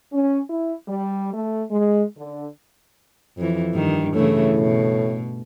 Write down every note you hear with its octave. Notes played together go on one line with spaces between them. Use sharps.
C#4
E4
G3
A3
G#3
D3
F2 E3
G2 D#3
A2 C#3 E3 A3
B2